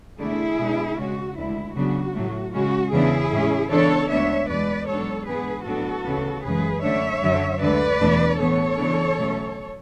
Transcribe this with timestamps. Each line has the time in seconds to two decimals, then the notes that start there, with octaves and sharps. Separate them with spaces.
0.19 E2 D3 A3 D4 E4 G#4
0.58 B2 G#3 D4
0.97 C#3 G#3 C#4 F#4
1.37 D2 D3 G#3 E4
1.75 C#3 F#3 B3 D4 F#4
2.14 A2 F#3 A3
2.53 C#3 G#3 C#4 F#4
2.92 E2 C#3 E3 B3 D4 E4 G#4
3.31 A2 G#3 C#4
3.70 C#3 E3 B3 D4 A4 C#5
4.09 D2 D3 G#3 B3 D4 C#5 E5
4.48 E2 B2 G#3 B4 D5
4.87 G#2 F#3 B3 D4 A4 C#5
5.26 G#2 E3 B3 D4 G#4 B4
5.65 A2 F#3 B3 D4 F#4 A4
6.04 D2 C#3 E3 B3
6.43 F#2 C#3 E3 G#3 G#4 B4
6.82 F#2 D3 A3 D4 C#5 E5
7.22 F#2 D3 F#3
7.60 D2 D3 G#3 B4 D5
8.00 E2 B2 A3 D4
8.38 A2 E3 B3 A4 C#5
8.77 C#3 E3 B3 D4
9.17 B2 F#3 A3 C#4